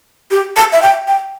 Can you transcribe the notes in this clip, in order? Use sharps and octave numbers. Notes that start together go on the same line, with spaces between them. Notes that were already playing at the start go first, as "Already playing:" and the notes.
G4
A5
E5
G5
G5